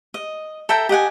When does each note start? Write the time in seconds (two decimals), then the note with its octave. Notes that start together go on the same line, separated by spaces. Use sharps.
0.14 D#5
0.69 A4 E5 G5 A#5
0.89 G4 D#5 F#5 G#5